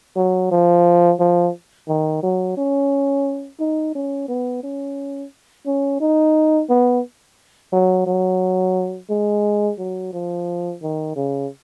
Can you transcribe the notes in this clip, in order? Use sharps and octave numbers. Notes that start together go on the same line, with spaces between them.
F#3
F3
F3
D#3
F#3
C#4
D#4
C#4
B3
C#4
C#4
D#4
B3
F#3
F#3
G#3
F#3
F3
D#3
C#3